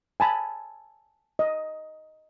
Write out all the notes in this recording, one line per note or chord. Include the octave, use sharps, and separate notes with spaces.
G#5 A5 B5
D#5